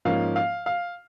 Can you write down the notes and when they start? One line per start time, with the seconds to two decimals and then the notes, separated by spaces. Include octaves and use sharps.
0.05 G#2 F3 A#3 C#4 F5
0.36 F5
0.66 F5